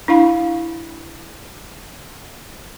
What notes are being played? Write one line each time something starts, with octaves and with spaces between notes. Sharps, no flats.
D4 E4 F5 B5